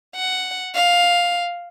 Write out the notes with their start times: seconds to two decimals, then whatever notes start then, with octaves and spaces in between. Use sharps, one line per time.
0.16 F#5
0.74 F5